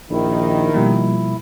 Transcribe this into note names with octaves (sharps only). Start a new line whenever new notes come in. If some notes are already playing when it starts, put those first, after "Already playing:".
A#1 D#3 E4
B2 F3 G3 A#3